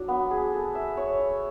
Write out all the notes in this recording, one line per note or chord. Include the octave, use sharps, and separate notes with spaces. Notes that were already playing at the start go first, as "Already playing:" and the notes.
Already playing: F#3 D4
B3
G#4
A4
E5
C#5
E5